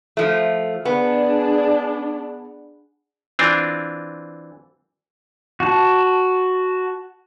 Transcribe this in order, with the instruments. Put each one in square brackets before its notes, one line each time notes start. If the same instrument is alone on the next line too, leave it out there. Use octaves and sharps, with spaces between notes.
[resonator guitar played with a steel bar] F3 A3
[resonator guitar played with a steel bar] B3 [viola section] D4 G#4
[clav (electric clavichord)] E3 C4 D4 F4
[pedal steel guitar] F#4 A5